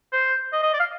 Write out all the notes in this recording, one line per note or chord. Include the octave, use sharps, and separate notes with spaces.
C5
D#5
D#5
D5
F5